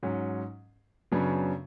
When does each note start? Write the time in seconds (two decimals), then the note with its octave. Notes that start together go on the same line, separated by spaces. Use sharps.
0.03 G#2 F#3 C#4
1.12 F#2 C#3 F#3 B3 D4